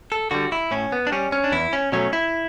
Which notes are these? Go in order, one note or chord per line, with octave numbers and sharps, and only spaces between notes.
A4
D3 G3 F#4
E4
A2 C#4
B3
D4
G3 C#4
C#4
D4
E2 E4
C#4
B2 F#3 A3 C#4
E4